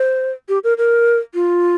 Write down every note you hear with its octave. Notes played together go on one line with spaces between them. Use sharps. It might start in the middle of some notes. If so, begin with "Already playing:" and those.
Already playing: C5
G4
A#4
A#4
F4